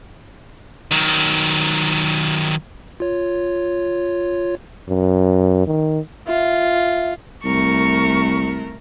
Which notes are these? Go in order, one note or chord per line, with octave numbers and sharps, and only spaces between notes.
D#3 F#3
F4 C#5
F#2
D#3
F4 E5
C2 A3 A#4 C#6